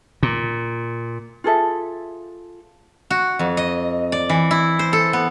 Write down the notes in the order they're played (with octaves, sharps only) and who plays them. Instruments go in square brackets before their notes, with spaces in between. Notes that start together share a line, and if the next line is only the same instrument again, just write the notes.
[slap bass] A#2
[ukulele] F4 G#4 A4 E5
[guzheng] F#4
F2
D#5
D5
E3
E4
C5
A4
B3